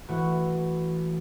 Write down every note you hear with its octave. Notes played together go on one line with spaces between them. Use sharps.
E3 A3 F#4